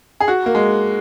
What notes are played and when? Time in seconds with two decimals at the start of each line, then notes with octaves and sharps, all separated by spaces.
0.20 G#4
0.28 F#4
0.46 A#3
0.55 G#3